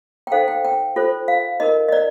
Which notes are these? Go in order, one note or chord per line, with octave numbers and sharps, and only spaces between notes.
G5
D#4 A4 C5 F5
G5
G5
F4 A4 C5
F5
D#4 A#4 D#5
D#5
D5